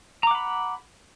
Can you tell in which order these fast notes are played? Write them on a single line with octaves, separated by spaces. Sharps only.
A#5 D6 F#5 B5